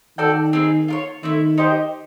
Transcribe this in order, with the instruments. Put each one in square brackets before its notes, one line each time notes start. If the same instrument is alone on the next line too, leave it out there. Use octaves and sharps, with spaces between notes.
[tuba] D#3 [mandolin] F#4 A4 D5 G5
[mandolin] C4 D#4 G#4 B4
F4 A#4 C#5
[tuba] D#3 [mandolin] A3 C4 E4
[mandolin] D#4 G4 C5 D#5